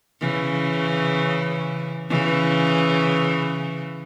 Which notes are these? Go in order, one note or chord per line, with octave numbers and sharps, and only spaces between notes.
C#3 E3
C#3 E3